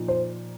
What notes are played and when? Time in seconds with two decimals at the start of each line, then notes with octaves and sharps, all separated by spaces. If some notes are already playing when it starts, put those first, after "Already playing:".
Already playing: A#2 F3 D#4
0.08 C5